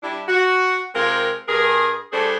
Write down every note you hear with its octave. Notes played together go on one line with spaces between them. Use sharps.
G3 D4 E4
F#4
C3 G#3 C4 F4 A#4
G2 G#4 A#4
G3 A3 D4 G#4 A4 C5